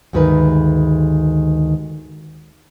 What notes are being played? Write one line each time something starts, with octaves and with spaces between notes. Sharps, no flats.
D2 G2 D#3 G#3 A#4 B4